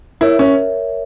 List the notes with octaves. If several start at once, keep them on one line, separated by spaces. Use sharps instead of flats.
E4 A#4 C#5 E5
C#4